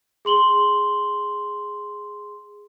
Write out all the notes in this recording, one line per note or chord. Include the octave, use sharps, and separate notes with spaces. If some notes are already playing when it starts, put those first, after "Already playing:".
G#4 C6 F#7 G7